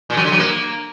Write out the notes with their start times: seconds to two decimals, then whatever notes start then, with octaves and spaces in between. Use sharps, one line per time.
0.10 A#2
0.17 F#3
0.25 D3
0.32 F#3
0.39 A#3